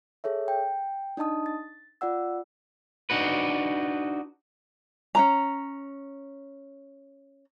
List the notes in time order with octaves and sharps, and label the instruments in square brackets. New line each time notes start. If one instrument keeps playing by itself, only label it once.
[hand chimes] G#4 A4 C#5 E5
G5
D4 D#4 D#5 A5 D#6
A6
F4 D5 F#5 E6
[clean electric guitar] D4 D#4 F#4 B4
[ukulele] C#4 D4 A#5